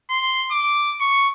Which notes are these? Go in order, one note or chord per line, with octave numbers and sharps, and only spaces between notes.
C6
D6
C#6